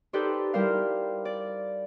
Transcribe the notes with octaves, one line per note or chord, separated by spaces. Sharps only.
D#4 G4 A4 B4 C5 D5
G3 E4 A#4 C5 F5
D5